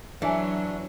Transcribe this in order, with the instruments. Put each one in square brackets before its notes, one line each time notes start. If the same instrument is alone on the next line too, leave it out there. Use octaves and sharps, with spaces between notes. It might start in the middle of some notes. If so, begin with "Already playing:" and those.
[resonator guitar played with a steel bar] E3 [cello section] F#3 [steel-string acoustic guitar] D4 [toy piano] G#4 E5 G#5